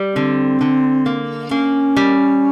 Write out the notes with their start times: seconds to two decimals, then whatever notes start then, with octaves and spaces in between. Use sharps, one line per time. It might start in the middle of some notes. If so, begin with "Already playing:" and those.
Already playing: G3
0.16 D3 C4
0.61 D3
1.06 A#3
1.51 A#3 C#4
1.97 G3